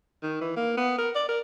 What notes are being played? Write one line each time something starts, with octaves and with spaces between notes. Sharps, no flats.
D#3
E3
A#3
B3
A#4
D5
A#4